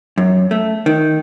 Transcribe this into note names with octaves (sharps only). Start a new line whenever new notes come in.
F#2
A3
D#3